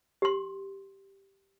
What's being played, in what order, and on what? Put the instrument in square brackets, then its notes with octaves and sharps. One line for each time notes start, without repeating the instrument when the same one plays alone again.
[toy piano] G4 C6